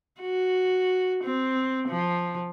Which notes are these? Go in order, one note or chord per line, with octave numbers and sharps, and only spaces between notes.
F#4
C4
F3